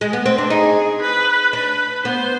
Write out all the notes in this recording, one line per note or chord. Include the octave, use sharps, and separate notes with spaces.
G#3
B3
C4
D4
D#4 G#4
B4
D4 B4
B3 C5